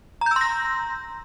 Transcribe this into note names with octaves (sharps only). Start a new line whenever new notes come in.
A#5 C6 E6 G6 A#6